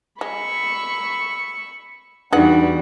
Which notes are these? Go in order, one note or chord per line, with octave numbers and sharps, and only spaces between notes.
G#3 B5 C#6 E6
E2 G3 D4 D#4 F#4 G#4 B4 F#5